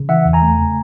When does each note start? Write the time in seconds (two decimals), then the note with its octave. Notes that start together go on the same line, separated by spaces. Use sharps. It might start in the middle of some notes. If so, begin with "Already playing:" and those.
Already playing: C#3
0.09 E3 E5 F#5
0.25 E2
0.33 G#5 A#5
0.42 A3
0.58 C#3